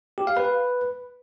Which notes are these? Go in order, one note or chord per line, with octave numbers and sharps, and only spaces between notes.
G4
F5
B4